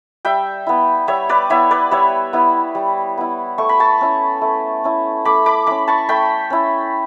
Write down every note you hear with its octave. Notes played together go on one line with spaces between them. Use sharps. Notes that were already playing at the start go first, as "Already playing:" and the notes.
G3 E5 G5
B3 E4
G3 C#5 E5
B4 D5
B3 E4 C#5 E5
B4 D5
G3 C#5 E5
B3 E4
G3
B3 E4
A3 C#6
B5
A5 C#6
C#4 E4
A3
C#4 E4
A3 B5 D6
B5 D6
C#4 E4 B5 D6
A5 C#6
A3 G5 B5
C#4 E4